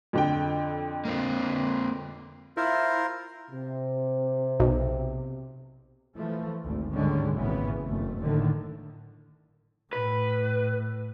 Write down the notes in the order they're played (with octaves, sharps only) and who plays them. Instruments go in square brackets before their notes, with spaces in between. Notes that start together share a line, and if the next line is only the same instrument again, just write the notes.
[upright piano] F2 D3 G5
[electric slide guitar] A#3 C4 F4
[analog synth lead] E4 [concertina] F4 A#4 C5
[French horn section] C3
[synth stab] B1
[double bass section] E3 F3 A3
G#1 D2 G#2
G#2 D3 D#3 G3 G#3 C#4
G#1 A#2 C#3 E3 B3
F#1 F2 A3
A2 D3 D#3
[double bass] A2 [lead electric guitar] B4